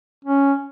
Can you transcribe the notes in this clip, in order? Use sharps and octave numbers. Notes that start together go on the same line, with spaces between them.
C#4